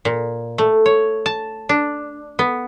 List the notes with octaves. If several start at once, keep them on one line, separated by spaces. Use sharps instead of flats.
A#2
A3
C#5
A5
D4
B3